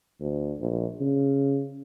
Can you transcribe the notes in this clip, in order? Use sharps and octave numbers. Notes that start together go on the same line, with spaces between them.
D2
A#1
C#3